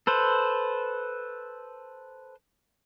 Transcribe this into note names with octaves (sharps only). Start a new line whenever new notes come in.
A4 B4 C5